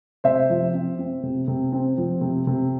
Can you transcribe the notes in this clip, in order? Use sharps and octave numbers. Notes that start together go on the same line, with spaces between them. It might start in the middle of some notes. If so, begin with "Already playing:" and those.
C3 C5 E5
F3
C4
C4
C3
C3
C4
F3
C3
C3